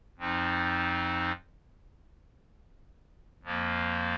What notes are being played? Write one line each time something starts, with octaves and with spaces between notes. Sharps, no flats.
F2 F3 C4 D#4
F2 F3 A#3